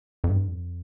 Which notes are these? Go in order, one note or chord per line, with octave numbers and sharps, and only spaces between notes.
F2
G2
F2